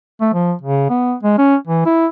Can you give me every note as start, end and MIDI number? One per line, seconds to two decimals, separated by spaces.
0.21 0.29 57
0.33 0.53 53
0.62 0.89 49
0.89 1.15 59
1.23 1.35 56
1.38 1.56 61
1.67 1.83 52
1.85 2.07 64